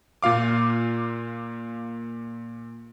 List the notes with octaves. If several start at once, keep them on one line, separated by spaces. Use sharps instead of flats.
A#2 F4 F5 D6